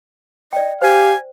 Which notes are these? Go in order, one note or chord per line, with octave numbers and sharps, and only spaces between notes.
D5 D#5 G5
G4 C5 F5 G#5